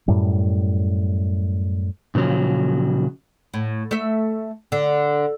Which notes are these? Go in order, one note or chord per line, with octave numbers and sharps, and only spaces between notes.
F#2 A2 G3
A#2 C#3 F3 F#3
A2
A3 E5
D3